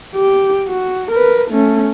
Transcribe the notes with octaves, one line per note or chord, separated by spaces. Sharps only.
G4
F#4
A#4 B4
A3 C#4